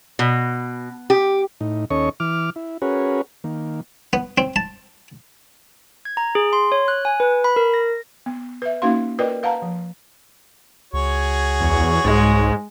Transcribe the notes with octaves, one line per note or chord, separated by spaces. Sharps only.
B2
G4
A2 D#4
D#2 C#4 A4 C#5 D#5 C#6
E3 D6 F6
E4
C#4 F#4 G#4 A#4 B4 C#5
D#3 A#3
B3
C4
A5
G#6
A#5
G#4
C6
C#5
F#6
G#5
B4
B5
A#4
A#6
B3
B4 E5
A#3 C#4 D#4 F#4 F5 C6
F4 A#4 B4 D5 D#5 G5
B4 F5 F#5 A5 A#5
F3
C#2 F#4 G#4 C#5
E2
C2 G#2 G#3